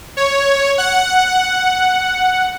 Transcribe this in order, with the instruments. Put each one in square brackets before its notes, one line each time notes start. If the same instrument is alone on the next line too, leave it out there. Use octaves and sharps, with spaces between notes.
[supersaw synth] C#5
F#5